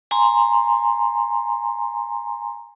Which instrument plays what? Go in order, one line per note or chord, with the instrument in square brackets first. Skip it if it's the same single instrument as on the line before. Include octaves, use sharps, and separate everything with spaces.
[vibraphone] G#5 A#5 C6